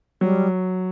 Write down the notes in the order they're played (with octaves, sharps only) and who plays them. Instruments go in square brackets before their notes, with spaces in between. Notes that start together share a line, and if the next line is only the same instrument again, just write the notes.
[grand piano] F#3 [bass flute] G3